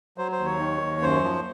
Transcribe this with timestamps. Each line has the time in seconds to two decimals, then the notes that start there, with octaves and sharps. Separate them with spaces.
0.18 F#3 C5
0.32 C5
0.39 D#2
0.46 C#5
0.59 D#3
0.81 D#2
1.02 F#2 C5
1.23 F3